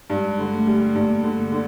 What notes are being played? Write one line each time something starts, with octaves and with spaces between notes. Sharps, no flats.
G2 G#3
D3
A3
G3
A3
G2 A#3
D3
A#3
D3